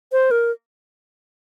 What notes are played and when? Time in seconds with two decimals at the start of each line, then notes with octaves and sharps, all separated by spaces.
0.12 C5
0.31 A#4